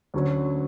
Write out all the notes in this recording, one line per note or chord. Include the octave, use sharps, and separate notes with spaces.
D2 D3 F#3 C#4